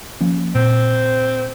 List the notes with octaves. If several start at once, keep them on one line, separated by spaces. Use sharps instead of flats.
F3 A#3 C#4
A#2 C4